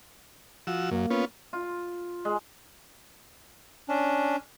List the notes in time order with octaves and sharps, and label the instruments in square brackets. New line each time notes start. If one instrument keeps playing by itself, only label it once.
[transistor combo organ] F3 F#4 E6
[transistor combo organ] F#2 [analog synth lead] A#3
[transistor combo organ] B3 C#4 F4
[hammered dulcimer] F4
G#3
[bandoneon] C#4 D4